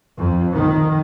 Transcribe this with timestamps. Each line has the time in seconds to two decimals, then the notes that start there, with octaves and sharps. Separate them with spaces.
0.16 F2
0.54 D#3